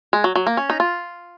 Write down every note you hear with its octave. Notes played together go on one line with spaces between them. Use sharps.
G#3
F#3
F#3
A#3
C#4
D#4
F4